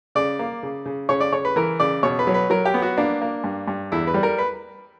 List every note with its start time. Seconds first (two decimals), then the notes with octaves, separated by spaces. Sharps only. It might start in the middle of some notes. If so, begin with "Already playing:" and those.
0.15 C#3 D5
0.39 A#3
0.63 C#3
0.86 C#3
1.09 C#3 C#5
1.20 D5
1.32 C#3 C#5
1.45 B4
1.56 E3 A#4
1.80 C#3 D5
2.03 B2 C#5
2.19 B4
2.27 F#3
2.34 B4
2.50 F#3 A#4
2.65 G4
2.74 B3
2.82 F#4
2.97 A#3 D4
3.21 A#3
3.44 G2
3.68 G2
3.92 E2 E4
4.07 B4
4.14 G3
4.23 A#4
4.38 B4